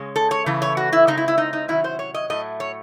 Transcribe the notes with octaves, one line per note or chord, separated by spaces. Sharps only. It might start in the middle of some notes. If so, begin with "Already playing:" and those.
Already playing: C#3 G#3 C#4
A4
C#5
C#3 E3 A3
C#5
F#4
E4
C#3 G#3 C4 D#4
E4
E4
D#4
D#4
C3 D#3 F#3 C#4 E4
C5
C#5
D#5
A2 F#3 A3 D#5
C#5